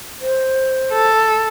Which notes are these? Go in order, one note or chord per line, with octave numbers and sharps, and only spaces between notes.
C5
A4